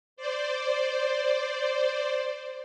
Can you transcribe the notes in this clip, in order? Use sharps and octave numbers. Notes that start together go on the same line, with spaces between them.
C5 D5